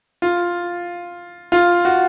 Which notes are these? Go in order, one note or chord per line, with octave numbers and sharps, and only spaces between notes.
F4
F4
F#4